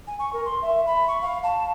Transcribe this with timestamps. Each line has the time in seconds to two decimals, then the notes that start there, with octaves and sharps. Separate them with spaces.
0.07 G#5
0.19 C#6
0.33 A#4
0.45 C6
0.62 E5
0.86 B5
1.08 C#6
1.21 F5
1.44 A5